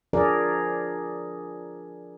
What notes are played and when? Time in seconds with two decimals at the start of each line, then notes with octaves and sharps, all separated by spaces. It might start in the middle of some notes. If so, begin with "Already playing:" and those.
0.13 F3 D4 G#4 A#4 D5